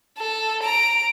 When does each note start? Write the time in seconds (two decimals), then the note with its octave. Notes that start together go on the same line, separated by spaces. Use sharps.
0.18 A4
0.63 A#5 D7